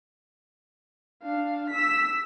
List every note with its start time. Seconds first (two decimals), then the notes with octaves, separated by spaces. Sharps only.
1.23 D4 F5
1.70 E6 B6